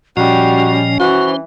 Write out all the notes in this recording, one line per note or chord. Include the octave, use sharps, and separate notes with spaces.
A#2 F3 G3 C#4 F#4 D#5
E3 F#4 C5